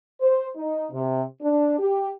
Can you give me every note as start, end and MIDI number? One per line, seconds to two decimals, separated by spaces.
0.21 0.46 72
0.55 0.86 63
0.92 1.23 48
1.41 1.78 62
1.78 2.09 67